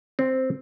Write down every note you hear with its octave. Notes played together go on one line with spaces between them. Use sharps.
C4